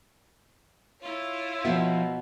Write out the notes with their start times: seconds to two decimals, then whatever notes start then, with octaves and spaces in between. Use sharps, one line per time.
1.00 E4 F4 C#5
1.65 B2 F3 B3 A#4 E5